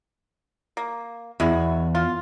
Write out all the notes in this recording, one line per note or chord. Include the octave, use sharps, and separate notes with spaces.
A#3
E2 G#3 E4 F#4
F4